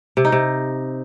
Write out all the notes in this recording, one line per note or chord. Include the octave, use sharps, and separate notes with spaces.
C3
D#4
C3